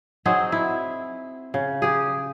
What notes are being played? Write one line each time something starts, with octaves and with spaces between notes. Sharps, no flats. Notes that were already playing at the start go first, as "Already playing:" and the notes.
F#3 C4 D#4 G#4
E4
C#3
G4 G#4